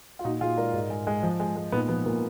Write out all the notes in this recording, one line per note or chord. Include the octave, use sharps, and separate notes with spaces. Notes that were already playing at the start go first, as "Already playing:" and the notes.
F4
A#2 D#4 F#4
A#2 F4 G#4
G#3 A#4 D5
G#2
G#3
G#3
F3
G#3
G#3
A#2 B3 D#4
F3 B3
A#2 A#3